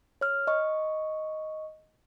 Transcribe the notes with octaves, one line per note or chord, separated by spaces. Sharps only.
C#5 F6
D#5 C#6